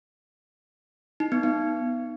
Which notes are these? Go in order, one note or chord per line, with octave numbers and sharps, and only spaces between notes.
D#4
B3
B3